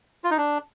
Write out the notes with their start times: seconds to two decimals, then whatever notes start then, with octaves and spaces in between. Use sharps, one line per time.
0.24 F4
0.31 D#4
0.38 D4